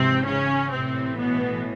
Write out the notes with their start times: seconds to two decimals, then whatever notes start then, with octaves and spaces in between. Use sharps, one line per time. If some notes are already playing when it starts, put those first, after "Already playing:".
Already playing: G#1 G#2 C3 E3 C4
0.26 C#3 C#4
0.71 A1 A2 C3 E3 C4
1.17 B2 B3